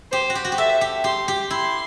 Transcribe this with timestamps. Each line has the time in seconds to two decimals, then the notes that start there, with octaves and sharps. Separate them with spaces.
0.12 G4 C5
0.30 F#4
0.35 G4
0.45 F#4
0.52 G4
0.58 A4 E5
0.81 G4
1.04 G4 C6
1.28 G4
1.50 E4 C6